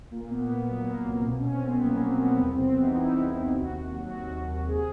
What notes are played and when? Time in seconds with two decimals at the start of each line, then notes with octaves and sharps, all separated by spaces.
0.11 A#2 A#3
0.29 A#2 B3
0.49 A#2 B3
0.67 F#3 B3
0.80 A#3
0.87 F#3 B3
1.06 C2
1.24 B2 C4
1.39 C#4
1.44 C2
1.53 C4
1.63 C2 B3
1.82 F#3 A#3
1.96 B3
2.01 F#3
2.10 C4
2.20 C2 B3
2.39 E2 B3
2.53 C4
2.58 C3
2.67 B3
2.77 E3 D#4
2.91 D#4
2.95 E2 E4
3.15 C3
3.33 C3
3.53 D#2 F#4
3.71 D#2
3.91 F#3
4.10 D#2 F#4
4.29 D#2
4.48 D#2
4.67 C3 G#4